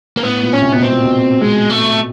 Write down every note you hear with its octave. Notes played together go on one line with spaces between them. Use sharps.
A#3
A2 B3
A#2
C#4
C3
B2 B3
C4
A#2
B2
G#3
A3